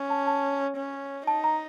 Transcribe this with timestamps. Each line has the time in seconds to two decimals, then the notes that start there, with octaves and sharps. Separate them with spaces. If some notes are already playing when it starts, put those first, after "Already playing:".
Already playing: C#4
0.10 A5
0.27 A5
0.77 C#4
1.27 D#4 A5
1.44 A#5